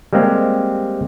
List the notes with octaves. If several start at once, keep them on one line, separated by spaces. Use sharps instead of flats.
G3 G#3 A#3 C4 G4